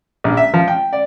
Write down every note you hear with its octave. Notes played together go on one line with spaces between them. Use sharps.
A#1
E5
F3
G5
D5